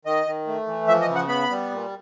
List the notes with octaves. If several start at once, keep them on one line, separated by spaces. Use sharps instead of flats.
D#3 D#5
D#3
A3
E3
F3 E5
D#5
C#3
F#5
B3 B5
G3
A#2